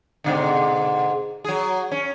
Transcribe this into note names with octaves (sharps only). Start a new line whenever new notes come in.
G#2 B2 D3
F#3 G#4
C#4